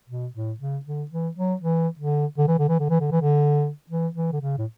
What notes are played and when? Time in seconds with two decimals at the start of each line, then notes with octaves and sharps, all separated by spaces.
0.09 B2
0.34 A2
0.60 C#3
0.85 D3
1.11 E3
1.37 F#3
1.61 E3
1.99 D3
2.38 D3
2.48 E3
2.59 D3
2.69 E3
2.79 D3
2.90 E3
3.00 D3
3.12 E3
3.21 D3
3.90 E3
4.15 E3
4.32 D3
4.41 C#3
4.58 A2